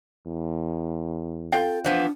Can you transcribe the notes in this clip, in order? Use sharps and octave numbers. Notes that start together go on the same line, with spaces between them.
E2
C4 F4 A4 G5
E3 F3 B3 D4